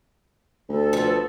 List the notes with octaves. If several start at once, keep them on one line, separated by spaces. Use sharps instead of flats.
D2 A4
F3 B3